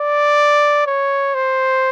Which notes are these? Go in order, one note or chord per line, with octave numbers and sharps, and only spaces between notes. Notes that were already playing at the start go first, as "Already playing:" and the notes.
Already playing: D5
C#5
C5